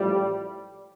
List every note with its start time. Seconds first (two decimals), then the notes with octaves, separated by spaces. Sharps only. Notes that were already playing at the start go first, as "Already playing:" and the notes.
Already playing: A1 A2 F3 G3